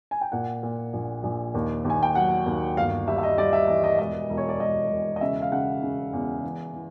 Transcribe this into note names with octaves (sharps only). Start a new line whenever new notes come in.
G#5
G5
A#2 F#5
A#2
A#1
A#1
D#2
D#2
G#5
G5
F#3 F#5
D#2
G1 F5
G3 E5
E5
D#5
G3 D5
E5
E3 D#5
D#5
E1 D#5
E1
C#5
D5
E1 D#5
E1
D#5
C#3 E5
F5
C#3 F#5
C#3
E2
E3
E3